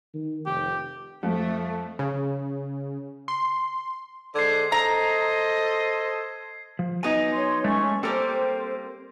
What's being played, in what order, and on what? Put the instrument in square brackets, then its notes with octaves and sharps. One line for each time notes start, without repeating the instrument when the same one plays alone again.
[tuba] D#3
[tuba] F1 [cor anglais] G4
[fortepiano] F2 [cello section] A3
[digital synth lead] C#3
C6
[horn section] D3 G#3 C5 [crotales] G#6 C7
[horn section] A4 C5 D#5 [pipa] A#5
[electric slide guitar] F3
[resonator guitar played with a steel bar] F#3 B3 D#4 [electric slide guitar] G#5
[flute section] C#5 C6
[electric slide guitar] G#3 A3 [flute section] C#4 C#6
[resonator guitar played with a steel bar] G3 A#3 G4 [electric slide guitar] C4 A4 A#4 [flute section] C5